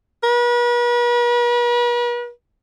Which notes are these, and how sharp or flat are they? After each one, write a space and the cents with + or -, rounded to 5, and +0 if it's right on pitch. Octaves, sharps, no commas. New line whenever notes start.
B4 -45